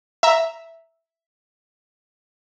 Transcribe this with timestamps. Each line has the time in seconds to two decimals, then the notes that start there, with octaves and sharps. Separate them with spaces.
0.23 E5 A#5